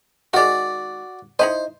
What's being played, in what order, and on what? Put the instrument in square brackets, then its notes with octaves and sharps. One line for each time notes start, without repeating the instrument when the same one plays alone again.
[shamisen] D#3 G#3 [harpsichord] F#4 D5
[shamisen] D#4 E4 D#5 [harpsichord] C5